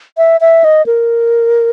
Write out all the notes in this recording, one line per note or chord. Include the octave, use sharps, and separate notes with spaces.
E5
E5
D#5
A#4